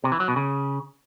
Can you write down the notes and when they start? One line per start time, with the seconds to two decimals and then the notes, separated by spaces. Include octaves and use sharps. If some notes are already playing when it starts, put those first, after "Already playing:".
0.04 C3
0.12 E3
0.20 F#3
0.28 B2
0.36 C#3